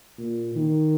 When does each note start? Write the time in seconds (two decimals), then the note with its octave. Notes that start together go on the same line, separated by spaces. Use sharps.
0.18 A#2
0.55 D#3